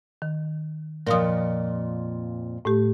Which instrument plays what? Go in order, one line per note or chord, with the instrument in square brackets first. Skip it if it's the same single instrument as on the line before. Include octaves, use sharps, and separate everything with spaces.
[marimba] D#3
[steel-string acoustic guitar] F2 A#2 [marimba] A#4 F5 D#6
[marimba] A2 A3 G4